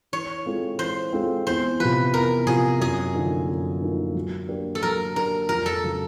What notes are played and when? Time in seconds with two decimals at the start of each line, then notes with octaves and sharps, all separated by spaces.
0.12 E3 C#5
0.46 G#3 C4 F4 A4
0.79 E3 C5
1.12 G#3 C4 F4 A4
1.47 E2 C5
1.80 C3 F3 B4
2.14 E2 A#4
2.47 C3 F3 G#4
2.80 F#2 G#4
3.14 D3 F3 A#3 D#4
3.49 F#2
3.81 D3 F3 A#3 D#4
4.15 F#3
4.49 A#3 D4 G4
4.75 A4
4.83 F#3 A#4
5.16 A#3 D4 G4 A#4
5.49 F2 A#4
5.66 A4
5.84 C#3 F#3